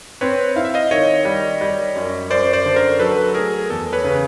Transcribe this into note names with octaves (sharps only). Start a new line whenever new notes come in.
C4 B4 C#5
E4 F5
E5
D#5 F5
D#3 C#5 D#5
G3
G3
F#2
F#2 C5 D5
C5 D5
D3
A#4 C5
F#3 A4 B4
A3 G#4 A#4
E2 A4
B4 C#5
C#3